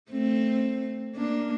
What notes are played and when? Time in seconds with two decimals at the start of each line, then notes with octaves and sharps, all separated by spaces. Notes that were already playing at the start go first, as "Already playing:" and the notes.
0.11 A3 C4
1.16 A#3 D4